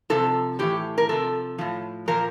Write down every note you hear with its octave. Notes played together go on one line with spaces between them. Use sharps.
C3 F3 A4
A2 E3 G4
A#4
C3 F3 A4
A2 F3
A#2 F3 A#4